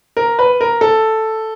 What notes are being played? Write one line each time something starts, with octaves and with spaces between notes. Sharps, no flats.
A#4
B4
A#4
A4